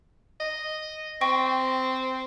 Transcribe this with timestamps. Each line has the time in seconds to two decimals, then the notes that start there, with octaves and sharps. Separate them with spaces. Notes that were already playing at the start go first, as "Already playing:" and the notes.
0.40 D#5
1.21 C4 G5 C#6 A#6